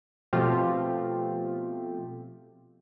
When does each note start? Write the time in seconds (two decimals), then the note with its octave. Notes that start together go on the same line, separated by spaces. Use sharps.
0.33 B2 F3 A3 C4 F4 G4